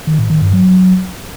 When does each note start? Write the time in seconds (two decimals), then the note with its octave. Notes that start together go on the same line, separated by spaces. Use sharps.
0.07 D#3
0.18 A2
0.30 D#3
0.41 G2
0.53 F#3